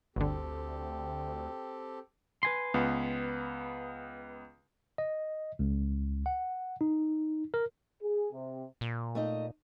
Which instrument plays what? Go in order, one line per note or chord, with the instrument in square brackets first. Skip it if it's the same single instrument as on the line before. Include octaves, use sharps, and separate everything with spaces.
[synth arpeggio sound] G1 D3 [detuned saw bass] D2 [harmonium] C4 G4 A4
[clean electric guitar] B4 G#5 C6
[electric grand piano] C#2 B3
[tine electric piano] D#5
C#2
F#5
D#4
A#4
[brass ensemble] G#4
C3
[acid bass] A#2
[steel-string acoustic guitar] A3 D#4 D#5